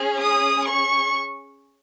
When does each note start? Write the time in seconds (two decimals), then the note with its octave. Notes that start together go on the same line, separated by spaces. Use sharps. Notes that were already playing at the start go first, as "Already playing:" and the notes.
Already playing: C#4 G#4
0.20 D#6
0.67 C#6